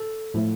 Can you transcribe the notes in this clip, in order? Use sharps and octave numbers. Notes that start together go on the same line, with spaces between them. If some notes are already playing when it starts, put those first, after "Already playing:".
Already playing: A4
A2 F3 A3